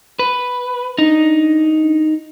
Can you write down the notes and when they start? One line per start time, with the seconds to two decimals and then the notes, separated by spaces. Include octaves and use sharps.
0.19 B4
0.98 D4 D#4